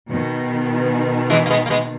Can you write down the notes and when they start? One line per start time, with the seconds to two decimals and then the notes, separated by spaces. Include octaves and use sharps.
0.09 B2 D#3
1.30 E3 G#3
1.46 A#3
1.50 G#3 B3
1.66 A#3
1.70 G#3 B3